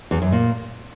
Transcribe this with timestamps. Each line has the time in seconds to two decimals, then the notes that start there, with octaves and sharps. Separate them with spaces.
0.11 E2
0.22 F#2
0.32 A#2